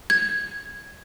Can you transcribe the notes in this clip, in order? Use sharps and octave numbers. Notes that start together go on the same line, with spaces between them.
G#6